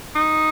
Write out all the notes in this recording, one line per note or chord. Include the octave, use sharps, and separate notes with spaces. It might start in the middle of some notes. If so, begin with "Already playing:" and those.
D#4